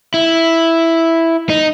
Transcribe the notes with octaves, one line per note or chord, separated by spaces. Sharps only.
E4
D#4